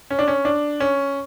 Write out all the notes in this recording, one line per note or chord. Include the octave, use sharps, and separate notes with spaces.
C#4
D4
C#4
D4
C#4